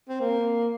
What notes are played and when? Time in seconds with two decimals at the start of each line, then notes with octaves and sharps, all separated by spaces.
0.09 C4
0.20 A#3